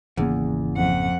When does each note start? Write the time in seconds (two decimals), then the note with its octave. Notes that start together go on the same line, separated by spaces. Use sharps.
0.17 G#1 E2 C#3 A#3
0.76 F2 F#5